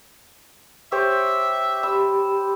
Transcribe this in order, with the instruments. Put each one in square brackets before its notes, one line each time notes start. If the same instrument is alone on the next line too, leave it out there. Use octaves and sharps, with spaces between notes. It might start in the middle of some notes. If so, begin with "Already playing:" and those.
[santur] G4 C5 C#5 [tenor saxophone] E5
[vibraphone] G4 B5 [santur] E6